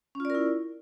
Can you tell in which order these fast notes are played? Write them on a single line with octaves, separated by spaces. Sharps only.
C#4 F4 D5 A#4 E4